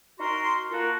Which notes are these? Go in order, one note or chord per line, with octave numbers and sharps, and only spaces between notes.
D#4 F#4 A#4 C6
A#3 F4 F#4 A4 A#4